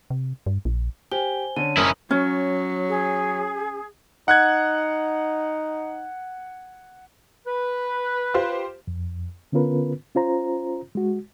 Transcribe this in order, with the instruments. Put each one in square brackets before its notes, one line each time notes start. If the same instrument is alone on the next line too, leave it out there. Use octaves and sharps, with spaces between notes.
[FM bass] C3
G2
A#1
[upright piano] G4 [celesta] C5 G#5 G7
[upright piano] D3 C#4 [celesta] D#7
[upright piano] F#1 A#4 F#7 [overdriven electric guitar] C#4 E4 [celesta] D#6
[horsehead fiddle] F#3 [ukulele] C#4
[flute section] G#4
[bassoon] D#4 [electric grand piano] F#5 F#6 G#6
[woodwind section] B4
[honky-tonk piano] F4 G4 C5
[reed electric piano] F2
D3 B3 C#4 F4 A#4 B4
C#4 F4 C5 A#5
G#3 F#4